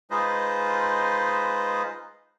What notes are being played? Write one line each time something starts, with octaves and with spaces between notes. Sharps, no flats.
G#3 D#4 F4 B4 C5 D#5